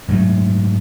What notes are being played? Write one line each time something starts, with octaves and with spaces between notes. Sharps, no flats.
G#2 F#3 A3